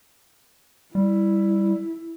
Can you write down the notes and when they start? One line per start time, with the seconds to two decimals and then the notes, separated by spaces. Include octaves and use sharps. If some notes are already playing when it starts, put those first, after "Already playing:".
0.95 G3 E4